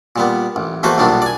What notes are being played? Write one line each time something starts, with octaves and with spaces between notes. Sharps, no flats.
A#2 G3 B3
A1
E2 A3 A#3 F#4 B4 C5
B1 A#2 F#3 G3 B3 D4
D5 G#5